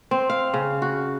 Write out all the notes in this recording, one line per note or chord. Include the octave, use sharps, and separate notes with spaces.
C4
F5
C#3
F#4